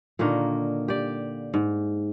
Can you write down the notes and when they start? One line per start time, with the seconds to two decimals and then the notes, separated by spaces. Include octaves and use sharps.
0.19 A#2 D3 D#3 A#3
0.88 G4 D5
1.54 G#2